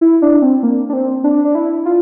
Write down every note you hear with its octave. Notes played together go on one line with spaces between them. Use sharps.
E4
D4
C4
A#3
D4
C4
D4
D4
E4
F4